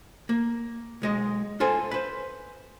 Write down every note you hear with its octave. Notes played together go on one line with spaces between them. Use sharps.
A#3
B1 G#3 D#5
F4 A4 C5 G#5
B4 C5